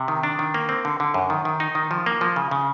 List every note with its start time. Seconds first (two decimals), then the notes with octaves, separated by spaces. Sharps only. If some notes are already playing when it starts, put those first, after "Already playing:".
Already playing: C3
0.08 D#3
0.23 D4
0.39 D#3
0.54 A#3
0.69 C4
0.85 D3
1.00 D3
1.14 F#2
1.30 D#3
1.45 D#3
1.60 D#4
1.75 D#3
1.91 F3
2.06 A#3
2.21 F3
2.36 C#3
2.51 C#3